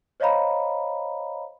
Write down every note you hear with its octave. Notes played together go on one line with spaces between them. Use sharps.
C5 C#5 D#5 F5 A#5 B5